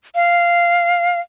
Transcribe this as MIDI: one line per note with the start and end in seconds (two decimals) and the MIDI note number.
0.15 1.19 77